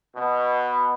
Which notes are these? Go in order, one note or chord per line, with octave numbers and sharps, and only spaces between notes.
B2